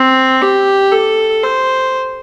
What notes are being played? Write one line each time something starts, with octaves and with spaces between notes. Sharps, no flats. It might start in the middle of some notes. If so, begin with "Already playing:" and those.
Already playing: C4
G4
A4
C5